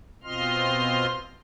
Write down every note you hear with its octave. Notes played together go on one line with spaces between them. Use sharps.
B2 C4 F4 D#5 C6 F6